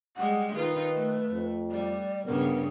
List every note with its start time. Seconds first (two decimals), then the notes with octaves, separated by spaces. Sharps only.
0.17 G3 G#3 F#5
0.55 D#3 D#4 F4 B4
0.96 A3
1.30 F2
1.71 G3 D5
2.26 G2 C#3 B3 A#4